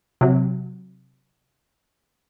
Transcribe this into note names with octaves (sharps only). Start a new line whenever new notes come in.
C3 F#3